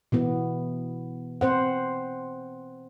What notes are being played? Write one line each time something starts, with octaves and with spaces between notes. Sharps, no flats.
B2 E3 B3
C4 C5 F#5